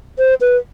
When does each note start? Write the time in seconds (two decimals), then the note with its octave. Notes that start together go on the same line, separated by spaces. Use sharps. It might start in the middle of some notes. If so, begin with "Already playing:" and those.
0.19 C5
0.41 B4